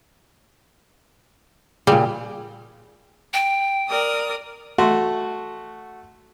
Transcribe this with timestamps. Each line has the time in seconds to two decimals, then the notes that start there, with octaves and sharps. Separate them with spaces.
1.87 A#2 C#3 G3
3.34 G5
3.88 A#4 D5 D#6
4.78 A3 F#4 C6